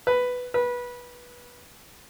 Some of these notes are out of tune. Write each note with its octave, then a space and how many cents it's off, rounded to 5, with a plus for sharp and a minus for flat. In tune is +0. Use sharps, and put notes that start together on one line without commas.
B4 +5
B4 -20